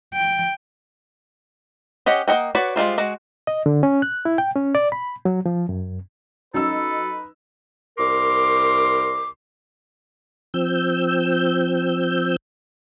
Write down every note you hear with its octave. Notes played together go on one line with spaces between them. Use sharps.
G5
C#4 G4 D#5 F#5
A#3 F4 D#5 F#5 G5
F#4 B4 C#5 D5 B5
G3 G#3 F4 C5
G#3 F#4
D#5
D3
C#4
F#6
E4
G5
C#4
D5
B5
F#3
F3
F#2
F#3 C#4 D#4 A4 B4 D#5 E6
C2 A#4 C6 D6
F3 C4 E6 G6